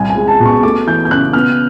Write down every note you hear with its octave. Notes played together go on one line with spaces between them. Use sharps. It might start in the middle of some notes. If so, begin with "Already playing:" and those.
Already playing: C2 G#5
G#5
G#3
A5
B2
C#6
A3 D6
E3 G6
G6
C#3 F#6
B3 F6